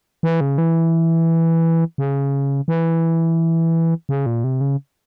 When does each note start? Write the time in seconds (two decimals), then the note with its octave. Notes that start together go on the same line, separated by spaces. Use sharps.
0.23 E3
0.41 C#3
0.58 E3
1.98 C#3
2.68 E3
4.09 C#3
4.26 A#2
4.44 C3
4.61 C#3